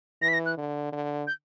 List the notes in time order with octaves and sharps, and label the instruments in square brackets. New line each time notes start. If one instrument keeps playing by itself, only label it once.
[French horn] E3 [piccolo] A#6
[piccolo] B6
A#6
F#6
[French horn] D3
D3
[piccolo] G6